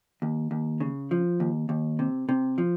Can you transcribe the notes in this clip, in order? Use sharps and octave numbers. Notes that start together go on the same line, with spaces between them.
D#2
D#2
C#3
F3
D#2
D#2
C3
C3
F3